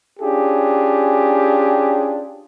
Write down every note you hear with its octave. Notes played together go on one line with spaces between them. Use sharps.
C#4 D4 F4 G4 G#4